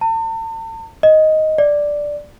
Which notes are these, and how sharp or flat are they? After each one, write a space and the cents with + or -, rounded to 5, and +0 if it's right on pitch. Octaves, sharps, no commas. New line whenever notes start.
A5 +40
D#5 +5
D5 +0